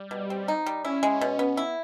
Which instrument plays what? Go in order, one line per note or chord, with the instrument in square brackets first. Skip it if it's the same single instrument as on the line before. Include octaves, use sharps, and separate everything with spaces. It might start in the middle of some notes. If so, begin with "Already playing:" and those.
Already playing: [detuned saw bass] G3
[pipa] B2
C4
D#4
G3
[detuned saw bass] C#4 [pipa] E4
[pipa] G#3
B2
B3
E4